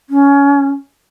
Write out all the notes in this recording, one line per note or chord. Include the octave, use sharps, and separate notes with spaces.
C#4